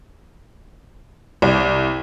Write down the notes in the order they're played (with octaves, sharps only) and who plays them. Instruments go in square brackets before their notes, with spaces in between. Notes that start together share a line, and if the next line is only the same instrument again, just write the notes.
[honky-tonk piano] C2